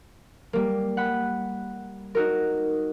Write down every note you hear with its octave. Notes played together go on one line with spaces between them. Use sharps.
G3 A#3
F#5 B5
D#4 F#4 A#4